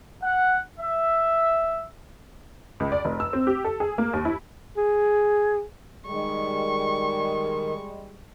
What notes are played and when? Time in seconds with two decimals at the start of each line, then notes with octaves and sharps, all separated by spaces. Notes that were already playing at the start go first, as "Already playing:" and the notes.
0.22 F#5
0.80 E5
2.80 C#2
2.92 D5
3.05 F1
3.20 E6
3.33 C4
3.47 G4
3.65 A4
3.80 G#4
3.98 A#3
4.13 D#2
4.25 E4
4.77 G#4
6.07 D#3 G3 G#3 C#6